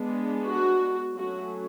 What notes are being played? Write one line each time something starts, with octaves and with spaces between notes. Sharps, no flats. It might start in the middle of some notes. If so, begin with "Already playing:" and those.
Already playing: G#3 B3 D4
F#4
F#3 A3 C#4 F#4